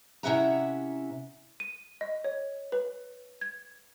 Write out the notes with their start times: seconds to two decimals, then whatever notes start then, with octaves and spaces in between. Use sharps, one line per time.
0.23 C3 C#4 E4 E5 F#5 A#5
1.60 D#7
2.01 D#5
2.24 C#5
2.72 B4
3.41 G#6